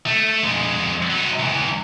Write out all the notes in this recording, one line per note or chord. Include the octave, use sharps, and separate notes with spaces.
A3
F2 G#3
F#3 D#4
C#2 E3